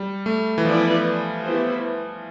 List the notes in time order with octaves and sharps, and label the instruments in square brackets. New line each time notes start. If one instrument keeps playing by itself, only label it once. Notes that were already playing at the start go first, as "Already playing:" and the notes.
Already playing: [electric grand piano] G3
A3
E3
[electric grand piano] F3 [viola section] B3 E4 B4 D5
[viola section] B3 E4 G4 C5